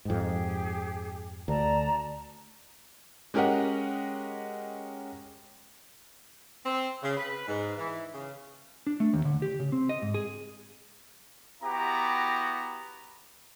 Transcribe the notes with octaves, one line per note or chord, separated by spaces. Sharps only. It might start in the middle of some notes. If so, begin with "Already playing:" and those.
F2 G#2 G4 G#4
D2 D5 A5 A#5
G#3 C#4 G4 A#4 D#5 F#5
C4
C#3
B4
G#2
E3
C#3
D4
A3
D#2
D3
G4
C#3
C4
D#5
G#2
G#4
B3 E4 F#4 G4 A#5